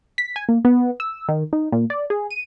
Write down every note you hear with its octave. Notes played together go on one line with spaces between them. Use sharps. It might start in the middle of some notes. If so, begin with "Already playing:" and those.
B6
G#5
A#3
B3
E6
D#3
D#4
A#2
D5
G#4
D#7